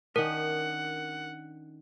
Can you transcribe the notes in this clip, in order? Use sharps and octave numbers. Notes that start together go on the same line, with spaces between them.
D#3 C#4 D4 A#4 F#5